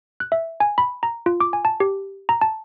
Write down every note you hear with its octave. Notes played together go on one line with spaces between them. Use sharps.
F#6
E5
G#5
B5
A#5
F4
D6
G#5
A5
G4
A#5
A5